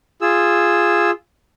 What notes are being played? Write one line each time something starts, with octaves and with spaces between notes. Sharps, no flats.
F4 G#4 E6